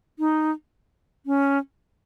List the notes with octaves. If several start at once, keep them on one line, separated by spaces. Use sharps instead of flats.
D#4
C#4